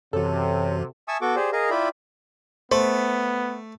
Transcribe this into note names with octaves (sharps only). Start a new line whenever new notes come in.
F#2 C3 E3 F#4 A4 C#5
E5 G#5 A5 C#6 D#6 E6
B3 F#4 A4 C#6 D6
G4 G#4 C5 D5
G#4 A#4 D#5 F5
E4 F4 D5 E5 G5 B5
A3 B3 C5